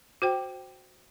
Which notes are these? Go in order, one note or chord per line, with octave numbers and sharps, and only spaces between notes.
F#4 C5 G5